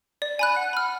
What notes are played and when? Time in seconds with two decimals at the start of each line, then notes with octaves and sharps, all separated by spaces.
0.22 D5
0.39 G#5 B5 F#6
0.56 F#5
0.73 B5 F6